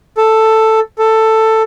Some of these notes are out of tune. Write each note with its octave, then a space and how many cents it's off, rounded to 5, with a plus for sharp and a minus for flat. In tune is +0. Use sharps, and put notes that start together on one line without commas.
A4 +5
A4 +10